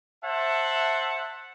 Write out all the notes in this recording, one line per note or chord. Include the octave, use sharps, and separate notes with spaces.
C5 E5 F#5 A5